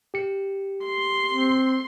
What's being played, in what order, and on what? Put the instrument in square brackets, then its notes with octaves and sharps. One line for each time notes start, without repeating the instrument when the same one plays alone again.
[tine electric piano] G4 C#7
[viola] C6
[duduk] C4